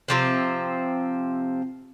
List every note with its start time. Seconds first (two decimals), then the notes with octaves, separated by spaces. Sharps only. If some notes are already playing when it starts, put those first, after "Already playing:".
0.08 C3 F3 C4